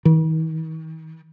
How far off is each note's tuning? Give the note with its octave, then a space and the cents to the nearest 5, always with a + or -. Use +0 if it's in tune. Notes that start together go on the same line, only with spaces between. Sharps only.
D#3 +45